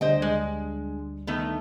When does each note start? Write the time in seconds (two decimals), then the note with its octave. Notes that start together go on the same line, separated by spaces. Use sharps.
0.01 D2 G3 D4 C5 D#5 G5
0.22 G#3
1.27 D#3 A3 B3